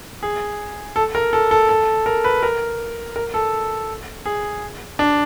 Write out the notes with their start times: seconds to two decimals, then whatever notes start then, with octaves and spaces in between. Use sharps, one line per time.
0.23 G#4
0.96 A4
1.15 A#4
1.33 A4
1.51 A4
1.69 A4
2.06 A#4
2.24 B4
2.43 A#4
3.16 A#4
3.34 A4
4.26 G#4
4.99 D4